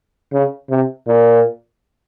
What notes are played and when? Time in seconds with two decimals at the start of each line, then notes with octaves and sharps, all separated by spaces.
0.33 C#3
0.70 C3
1.07 A#2